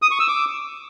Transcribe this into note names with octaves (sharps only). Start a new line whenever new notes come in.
D#6
C#6
E6
D6